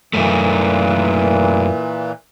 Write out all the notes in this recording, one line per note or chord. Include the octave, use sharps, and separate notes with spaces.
F#2 A#2 E3 A3